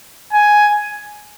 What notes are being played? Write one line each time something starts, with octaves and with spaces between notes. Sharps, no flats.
G#5